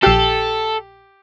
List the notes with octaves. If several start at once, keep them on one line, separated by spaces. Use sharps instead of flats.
A#1 G4 A4 E6 C7